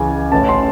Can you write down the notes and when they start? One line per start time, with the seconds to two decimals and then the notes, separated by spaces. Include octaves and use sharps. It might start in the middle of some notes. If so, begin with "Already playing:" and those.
Already playing: C#2 C#3 E3 G#5
0.32 A1 A2 E3 A5
0.49 C6